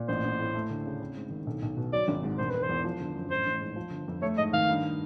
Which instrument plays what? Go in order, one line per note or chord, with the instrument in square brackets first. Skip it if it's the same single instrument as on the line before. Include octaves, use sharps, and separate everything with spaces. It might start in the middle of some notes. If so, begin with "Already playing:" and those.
Already playing: [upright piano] A#2
[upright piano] A1 [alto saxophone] C5
[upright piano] A1
A2
A3
D2
C#3
C4
G#2
D#3
B1
B1
B2
[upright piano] F#3 [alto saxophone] D5
[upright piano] G#1
G#2
[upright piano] E1 [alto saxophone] C5
[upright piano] E1 [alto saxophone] B4
[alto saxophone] C5
[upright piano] E2
F3
G1
F#2
[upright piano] A1 [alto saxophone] C5
[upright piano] A1
G#2
F3
G1
F2
[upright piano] A3 [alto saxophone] C#5
[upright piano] G#2 [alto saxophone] D#5
[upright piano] D#3 [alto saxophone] F5
[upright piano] G2